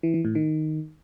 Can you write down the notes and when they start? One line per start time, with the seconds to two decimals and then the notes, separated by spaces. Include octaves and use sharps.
0.03 E3
0.14 E3
0.25 A2
0.35 D#3